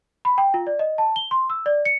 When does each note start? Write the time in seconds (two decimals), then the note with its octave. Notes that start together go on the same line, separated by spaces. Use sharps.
0.25 B5
0.38 G5
0.54 F4
0.67 D5
0.79 D#5
0.98 A5
1.16 G7
1.31 C6
1.50 E6
1.66 D5
1.85 C#7